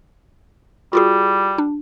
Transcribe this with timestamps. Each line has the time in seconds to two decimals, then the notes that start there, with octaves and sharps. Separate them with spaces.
0.93 G3 F4 F#4 G#4
1.58 D4